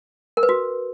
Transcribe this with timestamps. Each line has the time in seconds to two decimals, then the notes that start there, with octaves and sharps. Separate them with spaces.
0.37 A#4
0.43 B4
0.49 F#4